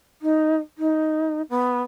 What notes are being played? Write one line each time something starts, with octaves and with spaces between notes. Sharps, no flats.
D#4
D#4
B3